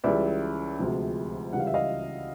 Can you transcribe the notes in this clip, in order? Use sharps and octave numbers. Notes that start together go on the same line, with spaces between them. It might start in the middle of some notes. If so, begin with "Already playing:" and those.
C#2 C#3 E3 G3 D5 E5
D2 C3 F3 G#3
C#2 C#3 E3 G3 F#5
F5
E5
D#5 F5